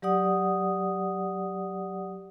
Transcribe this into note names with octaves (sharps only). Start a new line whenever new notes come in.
F#3 G4 D5 F#5 D#6